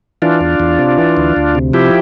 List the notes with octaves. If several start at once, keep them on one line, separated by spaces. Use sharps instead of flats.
E3 D4 F4
E2
E2
C3
E3
D2
D2
C3
F3 E4 G4